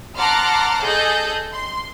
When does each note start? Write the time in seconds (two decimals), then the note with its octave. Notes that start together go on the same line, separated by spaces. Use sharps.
0.18 F#5 A5 A#5 C6 D6 F6
0.83 G#4 A4 D#5 G6
1.52 C6